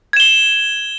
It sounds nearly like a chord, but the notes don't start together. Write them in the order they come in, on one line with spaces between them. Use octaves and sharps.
G#6 E7 G7